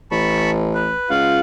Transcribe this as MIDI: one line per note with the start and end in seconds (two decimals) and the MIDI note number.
0.11 0.93 33
0.11 0.51 81
0.11 0.51 83
0.11 0.51 85
0.74 1.10 71
1.10 1.40 37
1.10 1.40 65
1.10 1.40 77
1.10 1.40 78